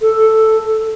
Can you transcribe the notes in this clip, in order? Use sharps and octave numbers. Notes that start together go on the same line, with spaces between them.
A4